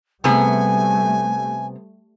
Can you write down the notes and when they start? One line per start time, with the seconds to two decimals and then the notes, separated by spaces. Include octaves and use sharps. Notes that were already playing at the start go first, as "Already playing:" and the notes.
0.24 C3 G3 A3 B3 G#4 G#5